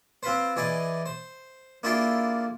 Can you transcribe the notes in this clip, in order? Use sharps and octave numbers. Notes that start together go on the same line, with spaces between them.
C4 F4 B4 C5
E3 G#4 D5 D#5
C5
A#3 D4 E4 F4 G#4 A4